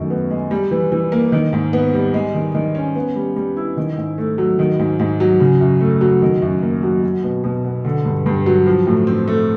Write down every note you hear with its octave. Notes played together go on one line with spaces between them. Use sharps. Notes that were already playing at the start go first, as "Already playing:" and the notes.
Already playing: F#2 D#3 A3
B3
G#3
G3
E3
E3
A#3
D#3
G#2
B3
G3
G#3
D#3
D#3
C#4
B3
G3
G3
E4
D#3
G#2
A3
F#3
D#3
G#2
G#2
F#3
C#3
F#2
A3
F#3
D#3
F#2
A#3
F#3
F#3
B2
B2
B3
D3
G2
G2
F#3
F3
A2
C4
A3